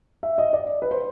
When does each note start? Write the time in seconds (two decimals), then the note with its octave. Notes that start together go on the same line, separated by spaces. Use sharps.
0.23 E5
0.38 D#5
0.53 D5
0.82 B4
0.91 C5